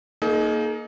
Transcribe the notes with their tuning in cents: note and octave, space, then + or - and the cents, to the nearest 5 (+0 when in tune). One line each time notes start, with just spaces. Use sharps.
A#3 +0 D#4 +0 G#4 +40